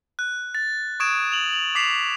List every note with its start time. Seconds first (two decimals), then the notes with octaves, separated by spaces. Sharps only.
0.19 F#6
0.55 A6
1.00 C#6 D#6 G#6 D7 E7
1.32 F7 F#7
1.53 F7 F#7
1.75 D6 B6 C7 E7 F7